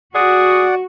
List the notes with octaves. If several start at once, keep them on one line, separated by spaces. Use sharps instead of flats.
F#4 G#4 D5 F#5